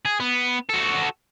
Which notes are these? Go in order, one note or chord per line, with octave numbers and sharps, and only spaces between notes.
G#4
B3
F#4 A4